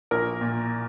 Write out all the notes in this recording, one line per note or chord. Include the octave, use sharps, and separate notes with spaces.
A#1 A#4
A#2